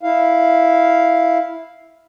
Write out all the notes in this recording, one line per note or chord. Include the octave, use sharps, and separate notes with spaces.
E4 F5